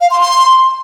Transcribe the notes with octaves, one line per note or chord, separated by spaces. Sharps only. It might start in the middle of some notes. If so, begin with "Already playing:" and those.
F5
C6
C6